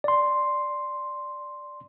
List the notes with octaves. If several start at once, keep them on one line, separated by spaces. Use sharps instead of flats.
D5 C6